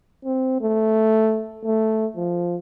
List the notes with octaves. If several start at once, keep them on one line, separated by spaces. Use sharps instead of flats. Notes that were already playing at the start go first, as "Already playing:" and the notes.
C4
A3
A3
F3